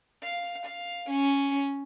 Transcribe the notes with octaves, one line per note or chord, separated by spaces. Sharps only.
F5
F5
C#4